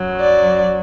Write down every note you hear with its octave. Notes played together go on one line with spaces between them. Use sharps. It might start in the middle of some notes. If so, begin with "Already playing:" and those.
Already playing: F#2 F#3
D5